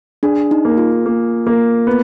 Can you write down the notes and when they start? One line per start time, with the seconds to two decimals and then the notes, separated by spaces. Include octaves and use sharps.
0.23 D4 G#4
0.51 D#4
0.65 A#3
0.77 F4
1.06 A#3
1.47 A#3
1.87 B3